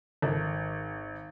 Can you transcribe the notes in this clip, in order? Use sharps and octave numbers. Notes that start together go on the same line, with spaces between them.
G#1